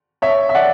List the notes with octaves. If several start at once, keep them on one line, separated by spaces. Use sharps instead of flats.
C#5 E5
E5
D5 F#5